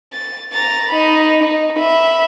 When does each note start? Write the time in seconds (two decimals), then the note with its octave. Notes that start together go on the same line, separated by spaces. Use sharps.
0.13 A6
0.53 A#5 A6
0.89 D#4 B5
1.43 D#4
1.78 E5 B5